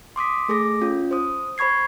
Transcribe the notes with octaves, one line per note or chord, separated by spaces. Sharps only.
C6 D6 D#6 B6
A3 G#4 A4 D6 A#6
C#4 F4
C5 D#6
C5 B5 C#6 G#6 C7